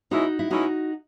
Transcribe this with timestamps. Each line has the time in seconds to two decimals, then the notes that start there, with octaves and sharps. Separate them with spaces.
0.11 B2 G#3 C#4 D#4 E4 F#4
0.39 E4
0.50 B2 G#3 C#4 D#4 E4 F#4